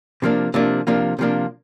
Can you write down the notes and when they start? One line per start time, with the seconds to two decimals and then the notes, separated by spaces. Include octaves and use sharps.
0.22 C3 F3 A#3 D4
0.54 C3 F3 A#3 D4
0.87 C3 F3 A#3 D4
1.19 C3 F3 A#3 D4